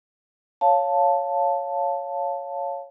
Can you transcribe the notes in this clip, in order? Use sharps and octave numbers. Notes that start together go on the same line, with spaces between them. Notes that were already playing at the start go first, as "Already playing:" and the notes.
C#5 F5 A5